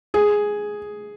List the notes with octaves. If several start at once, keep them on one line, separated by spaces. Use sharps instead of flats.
G#4